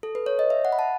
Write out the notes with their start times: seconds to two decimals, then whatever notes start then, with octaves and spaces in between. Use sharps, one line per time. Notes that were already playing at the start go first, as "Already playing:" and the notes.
0.03 A4
0.15 B4
0.26 C#5
0.39 D#5
0.50 E5
0.65 F#5
0.72 B5
0.79 A5